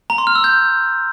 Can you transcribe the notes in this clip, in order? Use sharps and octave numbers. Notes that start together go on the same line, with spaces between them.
A#5
C6
F6
E6
G6